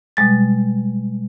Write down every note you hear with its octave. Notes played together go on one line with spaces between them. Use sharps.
B2 G3 G#3 A6